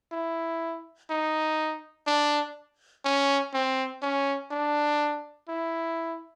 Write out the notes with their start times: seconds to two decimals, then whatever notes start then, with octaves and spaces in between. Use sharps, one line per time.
0.12 E4
1.10 D#4
2.07 D4
3.05 C#4
3.54 C4
4.02 C#4
4.51 D4
5.49 E4